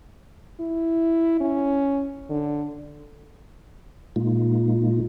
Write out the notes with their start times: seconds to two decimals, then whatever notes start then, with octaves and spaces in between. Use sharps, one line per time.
0.60 E4
1.41 C#4
2.30 D3
4.16 A#2 G#3 A#3 D#4 F4